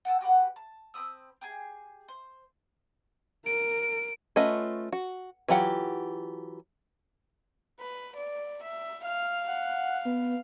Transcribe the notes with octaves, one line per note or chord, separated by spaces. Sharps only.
F#5 G5 A5 E6
F#4 G4 B4 F#5
A5
C4 B5 D#6 E6
G4 G#4 G#5
C5
A#4 D7
A3 C#4 F4 B4 D#5
F#4
E3 F#3 F4 G4 F#5
B4
D5
E5
F5 F6
F#5
B3